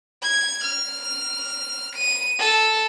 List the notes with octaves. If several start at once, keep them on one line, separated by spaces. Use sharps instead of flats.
G#6
F6
D#7
A4